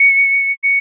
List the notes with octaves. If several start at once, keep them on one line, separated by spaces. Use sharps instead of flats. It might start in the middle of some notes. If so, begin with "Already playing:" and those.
Already playing: C#7
C#7